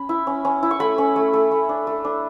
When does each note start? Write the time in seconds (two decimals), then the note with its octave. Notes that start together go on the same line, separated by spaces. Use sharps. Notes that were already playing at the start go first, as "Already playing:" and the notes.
Already playing: C#4 B5
0.09 E4
0.27 C#4
0.45 C#4
0.63 E4
0.71 C#6
0.80 A3 B5
0.98 C#4
1.16 A3
1.33 A3
1.51 A3
1.69 D4
1.87 A3
2.05 D4